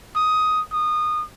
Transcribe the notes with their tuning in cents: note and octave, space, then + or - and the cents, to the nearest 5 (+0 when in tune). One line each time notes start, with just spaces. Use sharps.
D#6 +10
D#6 -25